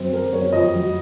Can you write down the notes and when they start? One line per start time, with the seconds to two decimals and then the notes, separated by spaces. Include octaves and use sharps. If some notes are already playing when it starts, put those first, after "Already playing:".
Already playing: F#2 C4
0.13 F#3 A#4
0.33 F#2 C#5
0.52 F2 D#5
0.73 F#3